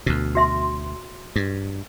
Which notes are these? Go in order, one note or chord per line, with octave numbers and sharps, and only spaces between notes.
D2 B2
F#4 E5 C6
G2